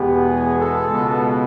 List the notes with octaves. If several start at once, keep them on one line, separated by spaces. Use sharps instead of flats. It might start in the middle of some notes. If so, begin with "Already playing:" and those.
Already playing: E2 B2 G#3 B3 G4
G#4
A4
C#2 B2 G#3 B3